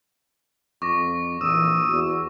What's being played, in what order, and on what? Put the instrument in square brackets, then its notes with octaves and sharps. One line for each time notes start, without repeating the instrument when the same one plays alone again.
[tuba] F2 [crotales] C#6 D6 A#6
[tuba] A#1 [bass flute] E3 [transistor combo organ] D#6 E6
[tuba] E2 [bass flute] F#4